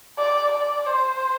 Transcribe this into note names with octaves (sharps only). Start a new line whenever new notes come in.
D5
D5
C5